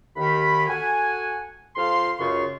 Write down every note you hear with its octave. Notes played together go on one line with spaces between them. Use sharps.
D#2 D#3 B5
F#4 A4 F#5 G#5
F2 F3 F5 C6
C#2 F#2 C#3 F4 C6 C#6